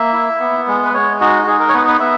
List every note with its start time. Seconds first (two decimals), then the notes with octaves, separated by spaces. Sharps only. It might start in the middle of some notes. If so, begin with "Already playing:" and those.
Already playing: A#3 E5
0.13 E4
0.40 B3
0.67 G#3
0.85 B4
0.94 G#3 C#5
1.21 D#4 F#4
1.43 F#4
1.47 D#4 G#4
1.60 A#4
1.69 C#5
1.74 B3 B4
1.88 B4
2.00 B3 E5